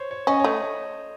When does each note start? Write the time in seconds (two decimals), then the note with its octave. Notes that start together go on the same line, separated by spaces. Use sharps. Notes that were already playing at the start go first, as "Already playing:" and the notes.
Already playing: C5 C#5
0.11 C#5
0.27 C#4 D#5
0.40 A3 C#5